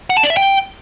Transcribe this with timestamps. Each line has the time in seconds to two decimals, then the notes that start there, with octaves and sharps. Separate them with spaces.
0.10 F#5
0.17 A5
0.23 D5
0.30 E5
0.37 G5